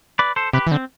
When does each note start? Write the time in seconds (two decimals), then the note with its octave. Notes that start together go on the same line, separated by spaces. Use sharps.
0.19 B4 D5
0.36 A4 C5
0.53 C3 G4 B4
0.67 E3
0.71 D3 C4